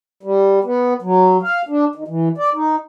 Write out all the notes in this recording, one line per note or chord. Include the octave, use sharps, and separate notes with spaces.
G3
B3
F#3
F5
D4
D#3
E3
D5
D#4